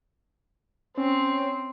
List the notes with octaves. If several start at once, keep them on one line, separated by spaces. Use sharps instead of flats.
C4 C#4